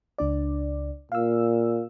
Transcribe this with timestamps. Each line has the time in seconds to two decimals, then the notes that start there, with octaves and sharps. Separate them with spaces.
0.18 C#2 D4 D5
1.12 A#2 F5 E6